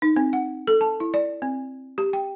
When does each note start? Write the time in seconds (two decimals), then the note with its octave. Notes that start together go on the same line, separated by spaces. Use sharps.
0.02 D#4
0.16 C4
0.33 F#5
0.67 A4
0.81 A5
1.00 E4
1.14 D5
1.42 C4
1.98 G4
2.13 G5